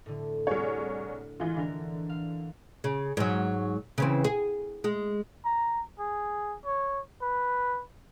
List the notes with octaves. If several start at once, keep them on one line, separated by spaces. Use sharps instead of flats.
A2 D3
C2 G#4 C#5
E3 G#3 F4
D3 E3 A#4
F5
C#3
G#2 F#3
C#3 E3 C4
G#4
G#3
A#5
G#4
C#5
B4